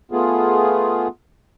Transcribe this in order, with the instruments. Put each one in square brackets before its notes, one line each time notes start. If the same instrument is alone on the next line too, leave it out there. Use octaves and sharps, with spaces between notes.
[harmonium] A3 B3 F4 G#4